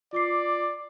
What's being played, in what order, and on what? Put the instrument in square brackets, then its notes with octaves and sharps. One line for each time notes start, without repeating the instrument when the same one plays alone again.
[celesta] F4 D6 C7 [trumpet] D5